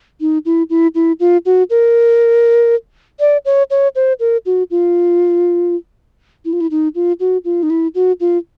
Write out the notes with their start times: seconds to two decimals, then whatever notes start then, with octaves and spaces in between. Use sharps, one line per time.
0.21 D#4
0.45 E4
0.70 E4
0.95 E4
1.20 F4
1.46 F#4
1.70 A#4
3.20 D5
3.45 C#5
3.71 C#5
3.96 C5
4.20 A#4
4.46 F#4
4.71 F4
6.45 E4
6.53 F4
6.61 E4
6.71 D#4
6.95 F4
7.20 F#4
7.45 F4
7.63 D#4
7.70 E4
7.95 F#4
8.20 F4